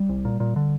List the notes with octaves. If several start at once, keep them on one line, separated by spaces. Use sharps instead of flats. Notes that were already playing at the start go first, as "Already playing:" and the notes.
Already playing: G3
C2
A#2
A#2
D3